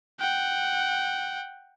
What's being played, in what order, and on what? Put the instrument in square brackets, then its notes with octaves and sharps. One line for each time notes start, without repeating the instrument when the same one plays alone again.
[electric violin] F#5 G5